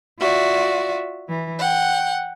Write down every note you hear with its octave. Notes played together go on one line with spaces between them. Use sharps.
F4 F#4 D5 E5
E3
F#5 G5